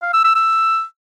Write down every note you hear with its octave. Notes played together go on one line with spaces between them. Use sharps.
F5
E6
E6
E6